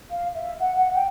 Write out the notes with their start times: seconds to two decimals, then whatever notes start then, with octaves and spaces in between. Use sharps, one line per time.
0.10 F5
0.35 E5
0.60 F#5
0.77 F#5
0.94 G5